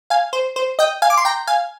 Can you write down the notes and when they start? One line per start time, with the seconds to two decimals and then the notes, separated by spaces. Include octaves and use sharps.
0.10 F5 G#5
0.33 C5
0.56 C5
0.79 D#5 G5
1.02 F5 G#5
1.10 D6
1.17 C6
1.25 G5 A#5
1.47 F5 G#5